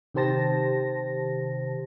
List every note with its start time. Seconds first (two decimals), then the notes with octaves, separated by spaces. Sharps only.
0.14 C3 D#3 G4 C5 A5 A#6